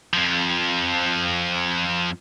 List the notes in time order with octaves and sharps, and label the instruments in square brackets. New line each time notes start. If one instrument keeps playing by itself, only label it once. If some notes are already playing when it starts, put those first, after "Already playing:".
[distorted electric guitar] F2 F3